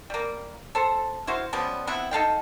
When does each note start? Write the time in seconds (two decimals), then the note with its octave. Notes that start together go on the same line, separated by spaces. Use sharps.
0.10 G3 A#3
0.75 A4 C5
1.27 E4 F#4 C5 F5
1.53 C#3 F3 G3 B3
1.87 B3 C4 E4 F#5
2.11 D#4 A4 F5 G5